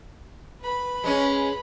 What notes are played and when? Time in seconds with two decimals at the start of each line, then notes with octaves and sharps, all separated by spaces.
0.60 B4 B5
1.04 G#3 C#4